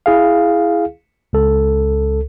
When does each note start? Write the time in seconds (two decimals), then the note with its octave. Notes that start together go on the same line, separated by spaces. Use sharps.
0.06 E4 G#4 F5
1.33 C#2 A4